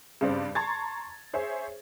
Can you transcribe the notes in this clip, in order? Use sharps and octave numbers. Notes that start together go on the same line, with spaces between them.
G2 C#3 C4 D5
A5 A#5 C6 C#6 G#6 A6
G#4 C5 C#5 E5